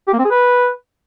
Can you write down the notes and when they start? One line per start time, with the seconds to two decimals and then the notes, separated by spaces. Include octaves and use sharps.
0.08 G4
0.13 A#3
0.19 C4
0.25 G#4
0.30 B4